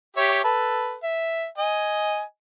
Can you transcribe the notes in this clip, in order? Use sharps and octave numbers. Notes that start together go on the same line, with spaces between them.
G4 C#5 E5
A4 B4
E5
D#5 G#5